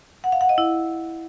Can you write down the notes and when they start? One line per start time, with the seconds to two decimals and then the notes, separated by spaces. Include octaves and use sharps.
0.24 F#5
0.32 F5
0.41 F#5
0.49 D#5
0.58 E4